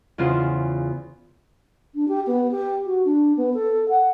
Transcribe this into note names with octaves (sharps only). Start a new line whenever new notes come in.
E2 C#3 F4 C5
D4
G4
B3
G4
F#4
D4
B3
A4
F#5